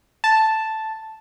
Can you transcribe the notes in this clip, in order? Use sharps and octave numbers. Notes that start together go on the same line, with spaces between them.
A5